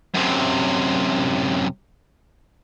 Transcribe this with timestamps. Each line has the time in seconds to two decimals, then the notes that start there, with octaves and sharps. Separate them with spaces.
0.14 F#2 C3